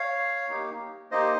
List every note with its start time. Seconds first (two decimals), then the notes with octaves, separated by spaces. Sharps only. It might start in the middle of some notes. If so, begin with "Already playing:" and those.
Already playing: C#5 F5
0.49 A#3 D#4 G4
1.11 A#3 D#4 G4 C5 D#5